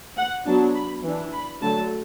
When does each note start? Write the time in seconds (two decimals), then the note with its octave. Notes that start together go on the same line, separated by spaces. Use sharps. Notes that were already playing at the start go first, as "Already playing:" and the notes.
0.17 F#5
0.45 F#3 B3 D4 A5
0.75 B5
1.03 E3 D4
1.33 B5
1.61 D3 F#3 A3 A5